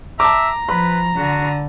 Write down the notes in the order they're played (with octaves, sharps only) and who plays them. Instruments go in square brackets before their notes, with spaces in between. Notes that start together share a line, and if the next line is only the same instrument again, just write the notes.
[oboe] E5 [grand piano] A5 D6 [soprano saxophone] A#5
[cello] F3 [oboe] B4 [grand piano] B5
[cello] D3 [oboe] F#4